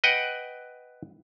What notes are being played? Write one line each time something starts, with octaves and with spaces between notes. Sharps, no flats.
B4 D#5 F#5 G5